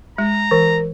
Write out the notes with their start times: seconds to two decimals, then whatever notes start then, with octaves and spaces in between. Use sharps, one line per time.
0.18 G#3 A#5
0.51 E3 A#4